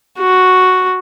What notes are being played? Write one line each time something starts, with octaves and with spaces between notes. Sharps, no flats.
F#4